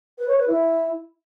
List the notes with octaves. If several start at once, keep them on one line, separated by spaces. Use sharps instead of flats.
B4
C#5
B4
E4